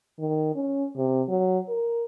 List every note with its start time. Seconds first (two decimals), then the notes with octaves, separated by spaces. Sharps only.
0.19 D#3
0.55 C#4
0.96 C3
1.28 F#3
1.69 A#4